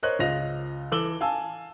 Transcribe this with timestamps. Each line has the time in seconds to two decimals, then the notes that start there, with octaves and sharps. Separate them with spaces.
0.03 A#4 C5 C#5 D#5 F#6
0.19 C#2 F4 D#5 A#6 F7
0.92 E3 A4 D6 E6 F#7 G7
1.21 F5 G#5 A5 E6